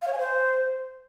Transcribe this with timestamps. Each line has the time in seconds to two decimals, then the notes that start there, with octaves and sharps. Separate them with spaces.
0.02 F5
0.07 C#5
0.13 G#5
0.18 C5